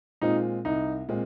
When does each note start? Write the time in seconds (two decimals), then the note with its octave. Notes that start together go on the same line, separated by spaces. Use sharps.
0.22 A#2 G#3 C4 D#4 F4
0.65 C2 D#4
1.09 A#2 G#3 C4 F4